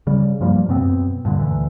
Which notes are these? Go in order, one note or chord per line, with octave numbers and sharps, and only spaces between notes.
C#3 G3
G2 F3 G3 A#3
F#2 B2 B3 C4
G2 A#2 D3
D2 E3